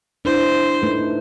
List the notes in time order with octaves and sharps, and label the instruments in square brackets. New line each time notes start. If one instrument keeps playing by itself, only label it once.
[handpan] D4 E4 [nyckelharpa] C5
[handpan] A3 D#4 B4